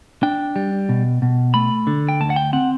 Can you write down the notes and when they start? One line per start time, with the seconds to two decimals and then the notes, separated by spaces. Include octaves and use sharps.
0.23 D4 G5
0.56 G3
0.89 B2
1.22 B2
1.54 A3 B5
1.87 D3
2.09 G5
2.20 D2 A5
2.30 F#5
2.36 G5
2.53 C4 F#5